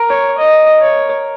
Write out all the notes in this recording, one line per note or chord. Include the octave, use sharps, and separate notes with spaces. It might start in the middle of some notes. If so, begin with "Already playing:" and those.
Already playing: A#4
C#5
D#5
C#5